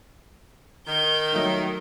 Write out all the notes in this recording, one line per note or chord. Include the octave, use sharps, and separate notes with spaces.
D#3 G6
F#3 A3 D#4